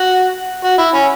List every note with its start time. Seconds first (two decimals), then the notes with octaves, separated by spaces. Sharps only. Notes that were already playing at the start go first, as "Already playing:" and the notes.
Already playing: F#4
0.64 F#4
0.78 E4
0.94 C#4